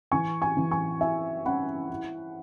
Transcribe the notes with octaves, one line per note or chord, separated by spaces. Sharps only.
E3 G#5 C#6
G#5 C#6
E3
G#5 C#6
E4 E5 G#5
C#4 F#5 B5
E4